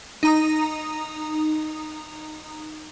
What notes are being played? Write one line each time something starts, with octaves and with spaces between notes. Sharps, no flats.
D#4 A#5 D#6